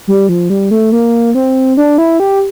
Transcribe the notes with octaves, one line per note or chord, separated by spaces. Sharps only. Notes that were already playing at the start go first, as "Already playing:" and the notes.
G3
F3
G3
A3
A#3
C4
D4
E4
G4